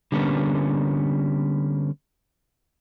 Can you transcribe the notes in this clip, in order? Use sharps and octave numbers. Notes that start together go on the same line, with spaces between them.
D3 G3 A#3 B3 C#4